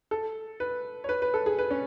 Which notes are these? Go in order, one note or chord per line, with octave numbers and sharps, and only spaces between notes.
A4
B4
C#5
B4
B4
A4
G#4
B4
C#4